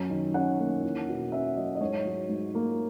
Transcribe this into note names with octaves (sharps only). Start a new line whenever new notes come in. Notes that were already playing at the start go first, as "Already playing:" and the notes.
Already playing: F#2 C#4
D#3
C#4 F#5
A#3
E2
B2
C#4 E5
F#3 D#5
D#5
G#2 C#5
F#3
G#2
A#3